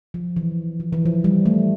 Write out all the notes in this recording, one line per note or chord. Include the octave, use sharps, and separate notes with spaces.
F3
E3
F3
E3
F3
G3
A3